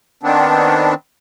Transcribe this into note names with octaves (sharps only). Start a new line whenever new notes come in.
D#3 B3 C4 D4